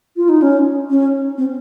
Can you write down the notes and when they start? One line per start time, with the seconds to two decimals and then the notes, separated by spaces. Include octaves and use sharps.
0.17 F4
0.29 D#4
0.42 C#4
0.90 C#4
1.38 C4